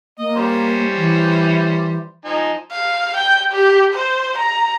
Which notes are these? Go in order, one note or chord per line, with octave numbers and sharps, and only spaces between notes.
A#3 D#5
G3 C#4 C5
E3
F3 D#4 G#5
F5
G5
G4
C5
A#5